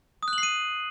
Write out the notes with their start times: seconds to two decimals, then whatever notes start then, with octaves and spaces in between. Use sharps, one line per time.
0.23 D#6
0.28 F#6
0.33 F#7
0.38 C7
0.43 D#7